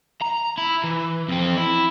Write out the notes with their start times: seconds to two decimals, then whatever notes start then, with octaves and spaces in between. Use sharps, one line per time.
0.21 A#5
0.58 E4
0.83 E3
1.29 F2 C4
1.57 E4